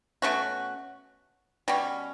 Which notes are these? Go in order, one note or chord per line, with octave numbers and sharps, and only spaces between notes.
B2 A3 C#4 F#4
B2 G3 C#4